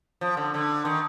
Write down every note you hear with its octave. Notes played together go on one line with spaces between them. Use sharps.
F3
D3
D3
D#3